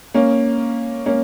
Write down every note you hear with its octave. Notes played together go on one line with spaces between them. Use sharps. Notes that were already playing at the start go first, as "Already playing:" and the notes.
A#3 C#4
A#3 C#4